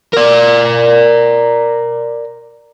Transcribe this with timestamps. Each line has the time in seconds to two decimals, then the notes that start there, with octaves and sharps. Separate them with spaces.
0.13 A#4 D5